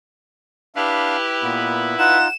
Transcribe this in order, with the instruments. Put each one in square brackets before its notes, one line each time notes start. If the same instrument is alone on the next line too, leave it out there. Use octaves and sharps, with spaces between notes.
[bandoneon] D4 F5 [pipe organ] E4 B4 [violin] G4
[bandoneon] A#2 B3
[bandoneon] D#4 F4 [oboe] F#5 [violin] E7